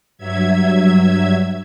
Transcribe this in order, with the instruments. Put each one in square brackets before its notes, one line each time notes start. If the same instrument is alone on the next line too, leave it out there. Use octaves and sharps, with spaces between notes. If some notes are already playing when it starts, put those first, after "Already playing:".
[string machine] G2 F#3 E5 G#6